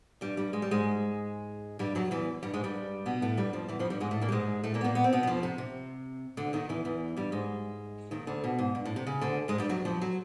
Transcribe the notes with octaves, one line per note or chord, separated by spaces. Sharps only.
G2 G3
G2 G3
G#3
G3
G#2 G#3
G2 G3
F#2 F#3
E2 E3
G2 G3
G#2 G#3
G2 G3
B2 B3
A2 A3
G2 G3
F2 F3
E2 E3
F2 F3
G2 G3
G#2 G#3
A2 A3
A#2 A#3
G3
G#2 G#3
A2 A3
A#2 A#3
B3
A#2 A#3
B3
C4
B2 B3
F#3
F2 F3
C3
C3
D2 D3
D#2 D#3
E2 E3
E2 E3
G2 G3
G#2 G#3
D#2 D#3
D2 D3
B2
G#2
G2
A2
C3
C#3
D2 D3
G#2 G#3
G2 G3
F#2 F#3
F2 F3
F#3